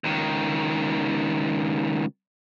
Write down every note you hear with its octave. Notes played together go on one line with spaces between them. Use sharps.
C#2 D#3